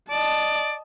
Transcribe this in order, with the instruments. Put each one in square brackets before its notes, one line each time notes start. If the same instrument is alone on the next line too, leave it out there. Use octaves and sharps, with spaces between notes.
[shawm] D5 [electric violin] D#5 A5